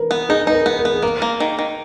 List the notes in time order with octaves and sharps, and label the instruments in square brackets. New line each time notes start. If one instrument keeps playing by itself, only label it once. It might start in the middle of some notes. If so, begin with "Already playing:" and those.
Already playing: [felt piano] A#4 B4
[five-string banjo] B3
[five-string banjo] D#4 [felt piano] G#4
[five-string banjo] D#4 [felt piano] B4
[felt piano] A#4
[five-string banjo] B3
[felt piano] A#4
[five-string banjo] B3
[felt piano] G#4
[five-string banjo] A#3 [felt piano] A#4
[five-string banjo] A#3
D#3
D#3